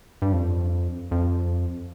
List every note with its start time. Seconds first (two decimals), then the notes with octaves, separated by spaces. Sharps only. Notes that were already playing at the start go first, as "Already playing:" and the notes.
0.22 G2
0.33 F2
1.11 F2